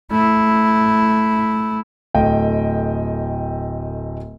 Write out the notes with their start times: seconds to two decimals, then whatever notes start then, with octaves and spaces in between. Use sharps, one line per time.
0.11 A3 E4
2.14 D1 A3 D#5 G5